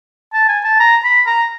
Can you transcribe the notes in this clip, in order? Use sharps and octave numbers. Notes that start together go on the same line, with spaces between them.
A5
G#5
A5
A#5
B5
A#5